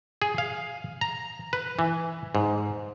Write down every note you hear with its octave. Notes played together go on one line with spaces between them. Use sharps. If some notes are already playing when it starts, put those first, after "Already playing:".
G#4
F5
A#5
B4
E3
G#2